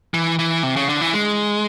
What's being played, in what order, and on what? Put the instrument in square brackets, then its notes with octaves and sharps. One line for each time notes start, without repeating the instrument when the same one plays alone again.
[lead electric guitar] E3
E3
C3
C#3
D3
E3
G#3